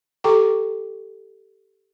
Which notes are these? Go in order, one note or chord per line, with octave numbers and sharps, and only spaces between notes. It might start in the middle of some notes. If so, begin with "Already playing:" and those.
G4 A4 G5 A#5 C#6 D6